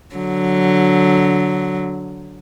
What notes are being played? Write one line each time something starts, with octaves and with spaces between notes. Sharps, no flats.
D3 F#3